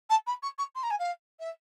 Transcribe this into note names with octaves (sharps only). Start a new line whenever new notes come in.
A5
B5
C#6
C#6
C6
A#5
G#5
F5
E5